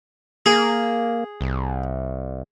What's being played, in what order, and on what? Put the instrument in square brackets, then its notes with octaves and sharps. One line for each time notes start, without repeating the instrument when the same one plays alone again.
[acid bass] A#3 [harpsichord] G#4
[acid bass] C2